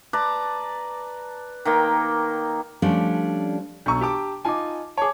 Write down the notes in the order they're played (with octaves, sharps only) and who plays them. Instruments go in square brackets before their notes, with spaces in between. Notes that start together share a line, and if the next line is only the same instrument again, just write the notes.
[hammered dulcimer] B4 D5 A5 A#5
D#3 A#3 G5
[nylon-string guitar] F3 G3 A3 C#4 D4
[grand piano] B1 C#6 [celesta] D4 A#5 E6
[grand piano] G4 A5 D6
[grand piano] D#4 F4 G#5 [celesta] A5 D6
[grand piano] G#4 C#5 [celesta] A5 D6